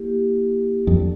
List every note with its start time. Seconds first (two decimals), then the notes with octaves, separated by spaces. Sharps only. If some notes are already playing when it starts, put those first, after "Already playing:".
Already playing: A#3 E4 G4
0.87 F2 D4 A4 D5